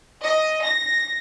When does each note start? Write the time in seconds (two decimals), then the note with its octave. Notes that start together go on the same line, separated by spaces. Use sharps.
0.23 D#5
0.63 A#6